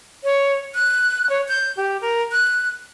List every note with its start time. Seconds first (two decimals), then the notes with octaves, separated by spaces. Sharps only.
0.24 C#5
0.75 F#6
1.30 C#5
1.49 G6
1.77 G4
2.01 A#4
2.32 F#6